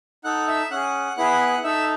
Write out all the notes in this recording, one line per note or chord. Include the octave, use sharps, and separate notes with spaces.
D#4 A4 F#5 F#6
E5 E6
C#4 G#4 F#5 F#6
B3 E4 G#4 F#5 F#6
D#4 A4 E5 E6